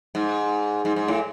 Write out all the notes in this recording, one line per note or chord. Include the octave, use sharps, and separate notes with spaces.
G#2
G#2
G#2
A2